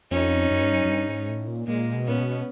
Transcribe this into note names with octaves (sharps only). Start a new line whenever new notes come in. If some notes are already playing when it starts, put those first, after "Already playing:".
F2 C#4 D#4
F#2
G2
F#2
F#2
G2
G#2
A2
A#2
A#2 G#3 A#3
B2
A#2 B3 C#4
B2